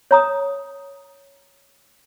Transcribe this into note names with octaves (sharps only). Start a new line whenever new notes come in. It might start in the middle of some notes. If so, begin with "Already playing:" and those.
C#5 A#5 D#6